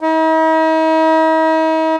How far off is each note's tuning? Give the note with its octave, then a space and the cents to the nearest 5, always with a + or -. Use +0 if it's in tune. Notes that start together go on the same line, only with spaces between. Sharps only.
D#4 +45